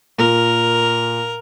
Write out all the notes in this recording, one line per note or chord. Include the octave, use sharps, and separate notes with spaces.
A#2 A#4